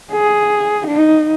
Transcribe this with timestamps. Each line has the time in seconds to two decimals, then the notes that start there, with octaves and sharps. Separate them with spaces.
0.12 G#4
0.87 D#4